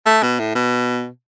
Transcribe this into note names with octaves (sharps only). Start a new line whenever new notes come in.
A3
B2
A2
B2